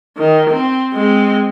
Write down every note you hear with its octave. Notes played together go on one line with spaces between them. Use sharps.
D#3
C4
G#3 C4